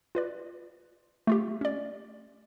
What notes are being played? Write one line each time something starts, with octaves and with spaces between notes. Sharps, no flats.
F4 B4 D5
A3 F4 G4
C#4 D5